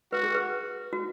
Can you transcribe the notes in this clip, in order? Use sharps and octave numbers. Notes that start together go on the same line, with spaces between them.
F#4 B4
G#4
B4
F#4